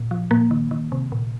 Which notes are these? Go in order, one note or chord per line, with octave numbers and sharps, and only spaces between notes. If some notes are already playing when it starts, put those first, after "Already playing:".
Already playing: A#2
F3
A#2 A#3
D#3
D#3
C3
A#2